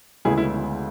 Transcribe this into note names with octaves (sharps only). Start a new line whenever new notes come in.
D2 C#3 G#3 B3 E4 G#4
E4